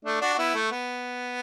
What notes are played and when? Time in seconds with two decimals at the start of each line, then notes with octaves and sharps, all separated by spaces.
0.05 A3 D4
0.22 D4 F#4
0.34 F#4
0.38 B3 E4
0.54 A3
0.71 B3